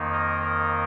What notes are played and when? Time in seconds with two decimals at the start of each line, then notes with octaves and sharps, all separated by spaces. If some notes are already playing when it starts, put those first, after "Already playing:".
Already playing: F2 D#3 A#3 D#4
0.13 A#4 D#5
0.43 A#4 D#5